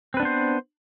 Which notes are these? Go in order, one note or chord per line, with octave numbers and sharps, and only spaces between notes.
B3 C4 D4 B4 C5